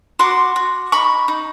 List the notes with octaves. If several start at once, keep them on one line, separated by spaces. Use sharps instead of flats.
F#4 C6 D6
F#4
D#4 B5 C#6
D#4